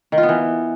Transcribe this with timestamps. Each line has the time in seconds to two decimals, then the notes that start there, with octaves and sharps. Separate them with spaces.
0.12 D#3
0.18 F4
0.23 B3
0.29 E3